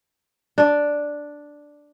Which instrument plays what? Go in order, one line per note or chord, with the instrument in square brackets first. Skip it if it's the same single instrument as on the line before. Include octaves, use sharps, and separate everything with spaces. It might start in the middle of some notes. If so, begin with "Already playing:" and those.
[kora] D4 D5